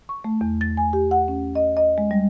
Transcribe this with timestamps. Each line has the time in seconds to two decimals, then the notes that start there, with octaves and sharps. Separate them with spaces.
0.09 C#6
0.24 A3
0.41 E2
0.61 A6
0.77 G#5
0.93 G4
1.11 F#5
1.28 C#4
1.55 D#5
1.77 D#5
1.98 G#3
2.11 G3